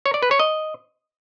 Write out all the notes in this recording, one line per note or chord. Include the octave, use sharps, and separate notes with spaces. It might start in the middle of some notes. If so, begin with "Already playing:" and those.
C#5
D5
B4
C#5
D#5